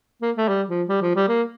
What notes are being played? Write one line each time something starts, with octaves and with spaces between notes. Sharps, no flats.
A#3
A3
G3
F3
G3
F3
G3
A#3